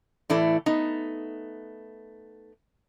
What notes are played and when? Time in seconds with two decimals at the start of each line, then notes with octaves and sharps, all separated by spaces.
0.30 A2 E3 A3 E4 D5
0.66 A3 B3 D#4